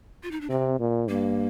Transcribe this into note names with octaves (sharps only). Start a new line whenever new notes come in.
F4
D#4
D4
C3 C4
A#2
G2 A#3